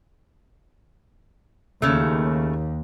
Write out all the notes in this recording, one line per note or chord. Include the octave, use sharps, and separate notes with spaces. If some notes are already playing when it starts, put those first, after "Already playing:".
D#2 C#3 A3